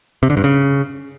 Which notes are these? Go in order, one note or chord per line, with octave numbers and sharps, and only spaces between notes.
C3
D3
G2
C#3